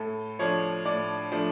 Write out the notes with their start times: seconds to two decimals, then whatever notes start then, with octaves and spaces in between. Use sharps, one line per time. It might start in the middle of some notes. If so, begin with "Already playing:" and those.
Already playing: A2 A4
0.39 F3 A3 D4 C#5
0.85 A2 D5
1.32 F3 A3 D4